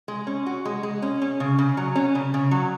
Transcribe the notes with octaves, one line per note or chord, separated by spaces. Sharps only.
G#3
C#4
F#4
G#3
G#3
C#4
C#4
C#3
C#3
F#3
C#4
C#3
C#3
F#3